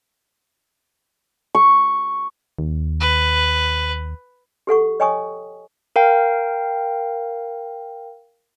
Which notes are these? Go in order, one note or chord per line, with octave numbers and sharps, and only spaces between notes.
C#6
D#2
B4
G4 A4 F#5 C#6
C#5 D#5 G5 G#5 C#6 D#6
A#4 F5 G5